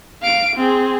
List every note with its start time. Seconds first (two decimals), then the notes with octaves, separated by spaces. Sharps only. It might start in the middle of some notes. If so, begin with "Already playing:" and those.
0.22 F5 D7
0.56 C4 G#4